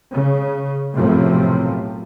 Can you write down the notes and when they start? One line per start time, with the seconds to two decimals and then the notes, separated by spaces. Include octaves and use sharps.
0.12 C#3
0.94 B1 F#2 A2 C3 F3